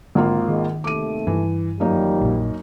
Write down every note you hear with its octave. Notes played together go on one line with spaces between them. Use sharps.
G#1 D3 A#3 F4
D#3 G#3
D#2 C3 A3 D6 D#7
G2 E3
F#2 D#3 F3 G3 A#3 D#4
A#1 A#2